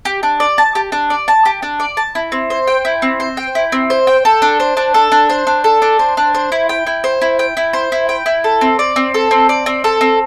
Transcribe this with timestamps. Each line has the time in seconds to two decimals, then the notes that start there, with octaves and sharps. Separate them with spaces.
0.05 G4
0.23 D4
0.40 D5
0.58 A5
0.75 G4
0.92 D4
1.10 D5
1.28 A5
1.45 G4
1.62 D4
1.80 D5
1.97 A5
2.15 E4
2.32 C4
2.50 C5
2.67 G5
2.85 E4
3.02 C4
3.20 C5
3.37 G5
3.55 E4
3.72 C4
3.90 C5
4.07 G5
4.25 A4
4.42 D4
4.60 C5
4.77 D4
4.94 A4
5.12 D4
5.30 C5
5.47 D4
5.64 A4
5.82 D4
5.99 C5
6.17 D4
6.34 C5
6.52 E4
6.69 G5
6.86 E4
7.04 C5
7.21 E4
7.39 G5
7.57 E4
7.73 C5
7.92 E4
8.09 G5
8.26 E4
8.44 A4
8.61 C4
8.79 D5
8.96 C4
9.14 A4
9.31 C4
9.49 D5
9.66 C4
9.84 A4
10.01 C4